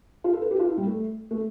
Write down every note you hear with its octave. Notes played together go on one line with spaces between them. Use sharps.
F4
A4
B4
G4
F4
E4
G3
A3
A3